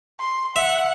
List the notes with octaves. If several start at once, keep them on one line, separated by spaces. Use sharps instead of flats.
C6
E5 F#5